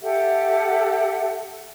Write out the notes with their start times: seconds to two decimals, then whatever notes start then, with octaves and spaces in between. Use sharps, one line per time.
0.02 G4 A4 E5 F#5